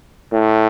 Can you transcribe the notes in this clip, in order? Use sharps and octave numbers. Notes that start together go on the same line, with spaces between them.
A2